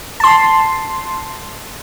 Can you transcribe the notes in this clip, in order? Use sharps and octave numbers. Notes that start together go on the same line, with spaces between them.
A5 C6